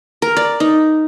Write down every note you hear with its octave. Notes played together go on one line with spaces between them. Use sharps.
A#4
D5
D#4